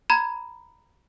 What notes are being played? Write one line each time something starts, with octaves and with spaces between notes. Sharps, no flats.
A#5 B5 G#6